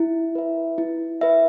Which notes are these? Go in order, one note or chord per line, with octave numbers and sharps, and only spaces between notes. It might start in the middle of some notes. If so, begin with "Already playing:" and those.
Already playing: E4
B4 E5
E4
B4 E5